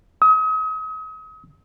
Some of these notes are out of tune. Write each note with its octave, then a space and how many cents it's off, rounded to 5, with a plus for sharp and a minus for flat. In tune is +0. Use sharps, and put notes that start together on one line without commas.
D#6 +40